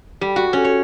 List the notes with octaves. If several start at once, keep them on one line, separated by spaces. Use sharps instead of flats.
G3
F#4
C#4
C#5